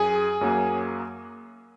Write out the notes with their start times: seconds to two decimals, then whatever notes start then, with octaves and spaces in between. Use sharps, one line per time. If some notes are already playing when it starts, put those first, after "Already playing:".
Already playing: F#2 G#4 G#5
0.41 F#2 F#3 A#3